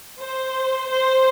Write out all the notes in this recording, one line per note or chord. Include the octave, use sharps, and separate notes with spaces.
C5
C5